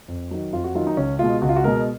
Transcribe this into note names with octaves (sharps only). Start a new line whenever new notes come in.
F2
D#3 F#3
F2 F4
F#4
D#3 F#3 F4
D#4
C#2 C#4
B2 G#3 F4
C#2 F#4
F4
F#4
B2 G#3 A#4